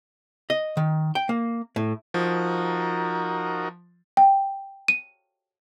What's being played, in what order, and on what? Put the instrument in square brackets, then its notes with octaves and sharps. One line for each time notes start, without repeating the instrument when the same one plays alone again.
[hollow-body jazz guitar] D#5
D#3
G5
A#3
A2
[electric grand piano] F3 [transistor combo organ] D#4 F#4 A#4
[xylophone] G5
D#7